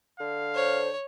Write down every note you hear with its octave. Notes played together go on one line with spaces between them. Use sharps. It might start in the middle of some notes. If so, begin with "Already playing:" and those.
D3 F5
C5 C#5